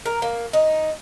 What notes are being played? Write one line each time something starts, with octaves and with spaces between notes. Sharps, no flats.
A#4
A#3
D#4